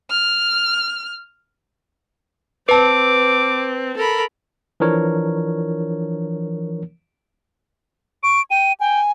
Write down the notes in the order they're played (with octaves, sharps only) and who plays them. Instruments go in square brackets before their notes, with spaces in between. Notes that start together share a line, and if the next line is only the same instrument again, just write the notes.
[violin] F6
[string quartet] C4 [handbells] B4 A5 [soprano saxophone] D6
[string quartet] A4 A#4 B5
[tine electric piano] E3 F3 D4 A#4 C#5
[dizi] C#6 [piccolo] D7
[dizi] G5 [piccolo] D#7
[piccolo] G5 [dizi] G#5